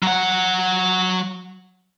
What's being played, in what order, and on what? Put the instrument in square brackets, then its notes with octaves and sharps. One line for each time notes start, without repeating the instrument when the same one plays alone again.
[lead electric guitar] F#3 F#5